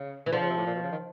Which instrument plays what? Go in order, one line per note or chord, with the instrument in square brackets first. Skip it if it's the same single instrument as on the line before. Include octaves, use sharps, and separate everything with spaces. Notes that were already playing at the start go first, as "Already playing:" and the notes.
Already playing: [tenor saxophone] C#3
[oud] E3
[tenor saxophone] D3 [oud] F3
[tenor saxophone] C#3
C3
A2
A#2
B2
C#3
D#3